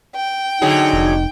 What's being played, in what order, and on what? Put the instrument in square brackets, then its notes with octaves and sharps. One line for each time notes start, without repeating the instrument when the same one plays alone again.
[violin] G5
[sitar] D3 F#3 G#4 [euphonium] D#4
[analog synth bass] F1